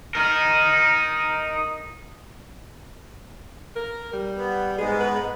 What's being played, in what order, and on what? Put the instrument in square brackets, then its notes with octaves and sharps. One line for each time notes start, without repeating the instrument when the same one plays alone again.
[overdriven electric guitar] D#4 A#4
[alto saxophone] A#4
G3
[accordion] B3
[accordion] G#2 G#3 B3 [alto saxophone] G#4
[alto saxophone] B4